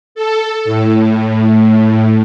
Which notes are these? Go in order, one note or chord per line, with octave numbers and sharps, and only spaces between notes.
A4
A2